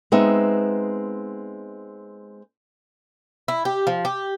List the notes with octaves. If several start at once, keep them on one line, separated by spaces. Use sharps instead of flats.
G#3 B3 C4 D#4 E5
E4
G4
F3
G4